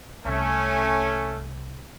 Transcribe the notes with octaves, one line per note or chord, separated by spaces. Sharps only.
C2 C3 A3 C#4